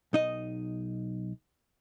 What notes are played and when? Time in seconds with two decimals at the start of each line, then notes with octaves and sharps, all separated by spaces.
0.13 B1 D#4 D#5